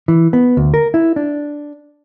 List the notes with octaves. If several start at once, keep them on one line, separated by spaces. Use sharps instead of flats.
E3
B3
D2
A#4
E4
D4